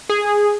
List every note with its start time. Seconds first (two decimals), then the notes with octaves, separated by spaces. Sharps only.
0.09 G#4